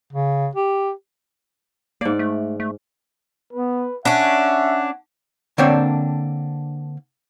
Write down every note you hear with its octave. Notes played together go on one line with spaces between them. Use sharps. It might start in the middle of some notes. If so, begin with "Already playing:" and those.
C#3
G4
G#2 A#3 D5
A3
A3
B3 B4
C#4 D4 E5 F#5
D3 A#3 C4 D4 C#5 G5